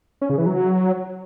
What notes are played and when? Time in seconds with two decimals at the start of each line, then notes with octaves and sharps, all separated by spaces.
0.21 C#4
0.30 C#3
0.38 E3
0.46 F#3